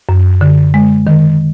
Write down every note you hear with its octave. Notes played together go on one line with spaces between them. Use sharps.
F#2
D3
G#3
D#3